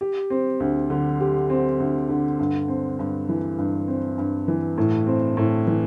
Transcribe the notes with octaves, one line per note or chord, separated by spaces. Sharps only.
G4
C4
D2
D3
G4
C4
D2
D3
G2
C4
G2
E3
G2
C4
G2
E3
A2
C4
A2
E3